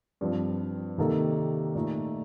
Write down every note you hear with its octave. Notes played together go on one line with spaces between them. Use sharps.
G2 F3 C4
C3 D#3 A#3 D#4 A4
A#2 A3 D#4